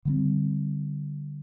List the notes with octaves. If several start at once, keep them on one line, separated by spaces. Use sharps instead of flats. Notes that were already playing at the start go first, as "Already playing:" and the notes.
D3 G3 C4